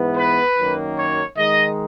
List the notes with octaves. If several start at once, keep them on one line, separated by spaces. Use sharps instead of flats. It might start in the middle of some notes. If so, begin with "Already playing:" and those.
Already playing: G#2 E3 B3
B4
F#2 D#3 F#3 A#3
C#5
D#3 G#3 D#4 D#5